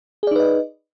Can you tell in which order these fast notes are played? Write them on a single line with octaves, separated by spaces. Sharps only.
G#4 D5 D#4 B4 D#5